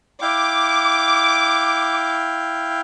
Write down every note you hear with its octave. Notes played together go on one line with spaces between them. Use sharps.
E4 F5 G5 D6